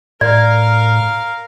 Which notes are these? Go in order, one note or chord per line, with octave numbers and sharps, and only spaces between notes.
A2 A#4 D5 F5